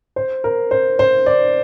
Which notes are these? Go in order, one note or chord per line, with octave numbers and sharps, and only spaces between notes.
C5
A#4
C5
C5
D5